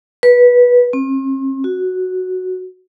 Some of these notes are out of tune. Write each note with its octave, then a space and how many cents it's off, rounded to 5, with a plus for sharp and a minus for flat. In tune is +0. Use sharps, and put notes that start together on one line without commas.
B4 -15
C4 +45
F#4 +0